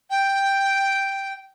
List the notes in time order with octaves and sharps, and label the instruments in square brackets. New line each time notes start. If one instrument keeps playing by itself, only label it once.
[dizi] G5